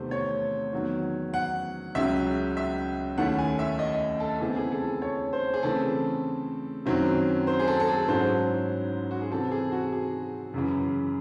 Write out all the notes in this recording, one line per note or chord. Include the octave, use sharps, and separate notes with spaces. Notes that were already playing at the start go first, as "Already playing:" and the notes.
Already playing: E2 C3 D#3 A3 C4 C5
C#5
E2 D#3 F#3
F#5
C#2 C#3 F#3 E5
E5
D#2 D#3 A3 C#4 E4 F#5
G#5
E5
D#5
A4
E2 C#3 E3 C4 E4 G#4
G#4
A4
C#5
C5
G#4
C#3 E3 A3 C4 A4
F#2 D#3 F#3 C4 E4
C5
G#4
A4
A4
G#4
G#2 F#3 C#4 E4 C5
F#4
G#4
C3 E3 C4 A4
G#4
F#4
G#4
F#2 C#3 E3